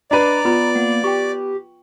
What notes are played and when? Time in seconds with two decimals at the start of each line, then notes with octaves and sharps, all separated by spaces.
0.11 D4 B4 D5 D#5 A#5
0.45 B3 F4 B4 B5
0.75 A#3 F#5
1.04 G4 G5 C#6